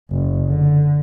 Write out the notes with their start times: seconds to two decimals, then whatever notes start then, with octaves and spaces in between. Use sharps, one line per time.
0.11 F#1
0.47 D3